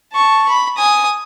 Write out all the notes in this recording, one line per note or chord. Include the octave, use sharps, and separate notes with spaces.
A5 C#6
B5
G#5 D#6